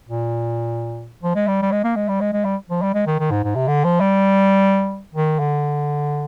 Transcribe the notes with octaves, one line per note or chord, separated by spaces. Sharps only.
A#2
F3
G#3
G3
G3
G#3
A#3
G#3
G3
G#3
G#3
G3
F3
G3
G#3
D#3
D#3
G#2
G#2
C3
D3
F3
G3
D#3
D3